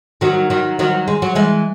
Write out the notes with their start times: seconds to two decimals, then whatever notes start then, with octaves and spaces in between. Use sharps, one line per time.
0.21 D#3 F#3
0.50 D#3 F#3
0.79 D#3 F#3
1.08 G#3
1.22 F#3
1.35 E3 G#3